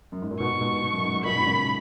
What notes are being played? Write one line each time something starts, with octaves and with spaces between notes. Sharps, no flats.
F#2
G#2
A#2
G#2 B2 C#6
G#2 B2
G#2
F#2
G#2
G#2
F#2 A#2 B5
G#2 B2
A#2 C#3